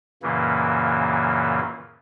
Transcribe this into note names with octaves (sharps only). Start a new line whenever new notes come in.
F#2 A#2 C#3 E3 A#3